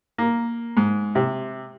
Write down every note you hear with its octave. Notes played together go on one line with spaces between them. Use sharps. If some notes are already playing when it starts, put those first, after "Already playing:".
A#3
G#2
C3